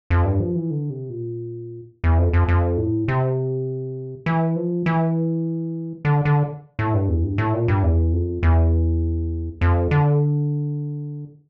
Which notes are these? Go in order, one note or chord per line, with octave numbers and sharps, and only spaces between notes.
F2
G2
F3
E3
D3
C3
A#2
E2
F2
F2
F2
A2
C3
E3
F3
E3
D3
D3
A2
G2
E2
G2
A2
A#2
G2
E2
F2
E2
F2
D3